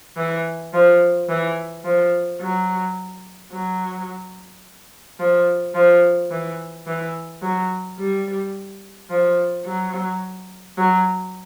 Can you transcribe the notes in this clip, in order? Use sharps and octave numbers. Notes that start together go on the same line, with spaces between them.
E3
F3
E3
F3
F#3
F#3
F3
F3
E3
E3
F#3
G3
F3
F#3
F#3